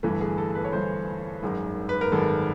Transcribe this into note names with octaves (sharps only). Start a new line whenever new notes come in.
G1 G2 E3 A3
G#4
A4
B4
C#5
G1 G2 E3 A3 C5
G#1 F#2 D#3 G#3
B4
A#4
G#1 F#2 D#3 G#3 A4